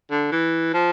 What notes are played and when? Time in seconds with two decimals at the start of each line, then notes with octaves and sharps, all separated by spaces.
0.11 D3
0.32 E3
0.74 F3